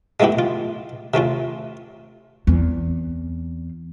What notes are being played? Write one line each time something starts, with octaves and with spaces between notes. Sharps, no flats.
G#3 A3 B3 E4 G4
F4
C3 A3 C#4 F4
E2 C4